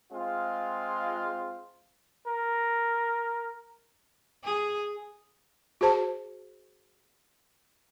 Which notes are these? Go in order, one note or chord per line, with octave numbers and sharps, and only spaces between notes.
G#3 C4 F4
A#4
G#4
F#4 G#4 C5 A5